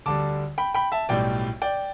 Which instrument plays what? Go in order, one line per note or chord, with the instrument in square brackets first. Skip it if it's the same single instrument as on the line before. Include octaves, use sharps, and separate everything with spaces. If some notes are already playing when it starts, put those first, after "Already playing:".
[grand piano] D2 D3 G3 A5 D6
G5 B5
G5 B5
E5 A5
B1 A2 G3 D5 G5
D5 G5